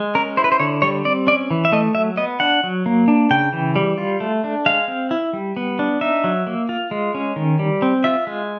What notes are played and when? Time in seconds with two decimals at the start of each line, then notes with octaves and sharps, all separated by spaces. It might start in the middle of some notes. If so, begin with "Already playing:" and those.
Already playing: G#3
0.15 C#4 A#4
0.37 E4 C5
0.44 B4
0.52 C5
0.60 D3 C#5
0.82 G3 C#5
1.05 C4 D5
1.27 C#4 D5
1.51 E3
1.65 E5
1.72 A3 D#5
1.95 F#3 E5
2.17 B3 D#5
2.40 D4 F#5
2.63 F#3
2.86 A#3
3.08 D4
3.31 C#3 G5
3.53 E3
3.76 G3
3.98 F4
4.20 A3
4.44 D4
4.66 G#3 F5
4.88 C4
5.11 E4
5.33 G3
5.57 B3
5.79 D4
6.01 D#4 E5
6.24 F#3
6.47 A#3
6.69 F4
6.91 G#3
7.15 C#4
7.36 D#3
7.59 G3
7.82 C4
8.04 F4 E5
8.27 G#3